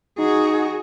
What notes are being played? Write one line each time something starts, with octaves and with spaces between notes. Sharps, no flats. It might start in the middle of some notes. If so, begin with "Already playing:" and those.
D#4 F#4 G#4